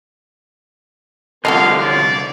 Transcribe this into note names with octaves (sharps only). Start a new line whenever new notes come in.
C2 D3 F3 F#3 C4 A4 D#5 F5
C#5 D5